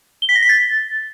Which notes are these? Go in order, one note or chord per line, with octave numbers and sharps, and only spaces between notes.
G7
B6
A#6
B6
A6